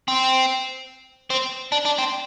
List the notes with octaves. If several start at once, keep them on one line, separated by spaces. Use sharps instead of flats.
C4
C4
D4
D4
C4